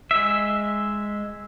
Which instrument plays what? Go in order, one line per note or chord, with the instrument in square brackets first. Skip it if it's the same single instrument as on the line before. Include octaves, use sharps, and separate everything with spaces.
[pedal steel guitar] G#3 E5